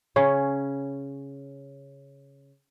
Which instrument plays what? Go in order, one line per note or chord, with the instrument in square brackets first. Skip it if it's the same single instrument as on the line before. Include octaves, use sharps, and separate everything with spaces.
[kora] C#3 C#4